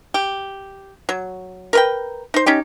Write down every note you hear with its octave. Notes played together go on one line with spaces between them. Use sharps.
G4
F#3
A#4 B4 G5
D#4 C5
C#4 D#4 G4